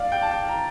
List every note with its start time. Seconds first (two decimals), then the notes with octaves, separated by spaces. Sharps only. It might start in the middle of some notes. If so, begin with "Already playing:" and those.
Already playing: D5 F5
0.12 G5
0.22 A5
0.31 G5
0.48 A#5